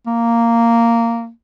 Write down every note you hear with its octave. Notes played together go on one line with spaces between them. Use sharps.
A#3